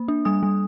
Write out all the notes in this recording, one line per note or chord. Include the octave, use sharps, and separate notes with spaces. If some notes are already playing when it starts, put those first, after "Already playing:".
Already playing: A#3
D4
G3 D#6
G3